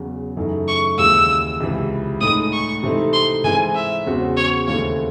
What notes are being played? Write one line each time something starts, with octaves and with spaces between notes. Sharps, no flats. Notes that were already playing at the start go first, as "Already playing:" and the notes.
Already playing: E2 C#3 F#3
F#2 C#3 E3 A3 D#4
C#6
D#2 C#3 E3 G#3 E6
C#2 C3 E3
A2 G#3 D#4 G#4 D#6
C#6
C3 E3 A3 C4 D#4
C6
G#2 E3 G#3 C4 G#5
E5
E2 C#3 G#3 C4 F#4
C#5
D#2 C#3 E3 A3 C4 C#5